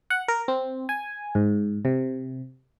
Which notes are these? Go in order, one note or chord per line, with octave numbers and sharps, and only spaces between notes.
F#5
A#4
C4
G#5
G#2
C3